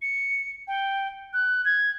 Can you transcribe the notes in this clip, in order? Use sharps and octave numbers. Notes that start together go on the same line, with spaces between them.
C#7
G5
F#6
G#6